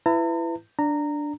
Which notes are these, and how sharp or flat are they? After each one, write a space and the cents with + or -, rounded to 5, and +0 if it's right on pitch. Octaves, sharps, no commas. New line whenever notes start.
E4 +20 B4 +15 A#5 -45
D4 +0 A#5 -15